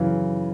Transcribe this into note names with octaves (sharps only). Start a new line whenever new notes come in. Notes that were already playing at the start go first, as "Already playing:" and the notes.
Already playing: F#2 C#3 E3